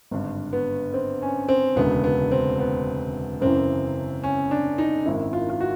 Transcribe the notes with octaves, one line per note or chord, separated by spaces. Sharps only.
G#1 G2 D3
B3
C4
C#4
C4
E1 D2 C#3 B3
B3
C4
B3
F#1 F#2 C#3 E3 C4
C#4
D4
D#4
G#1 F#2 D#3 E4
F4
F4
F#4